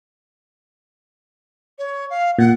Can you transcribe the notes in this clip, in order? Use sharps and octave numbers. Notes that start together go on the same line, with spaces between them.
C#5
F5
A#2 F#5